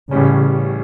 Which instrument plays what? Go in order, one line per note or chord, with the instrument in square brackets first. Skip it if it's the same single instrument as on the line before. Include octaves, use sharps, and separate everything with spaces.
[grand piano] A1 A2 G3 C#4 [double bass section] C#3